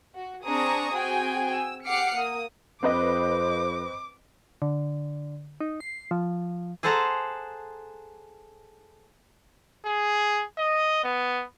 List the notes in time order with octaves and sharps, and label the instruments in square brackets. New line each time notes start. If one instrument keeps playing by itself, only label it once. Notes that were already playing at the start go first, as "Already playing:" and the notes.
[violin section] F#4
C4 D4 G#4 A#5 C#6 D#6
C4 F#4 G#4 G5 G#5
E6
G4 F#5 D6 F6 C7 C#7
A#3 D#6
[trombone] F2 [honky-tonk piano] C4 B4 D#5 [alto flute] C5 [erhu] D6
[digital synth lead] D3
D#4
C7
F3
[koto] G#4 A4 C5 F#5 A5 A#5
[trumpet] G#4
D#5
B3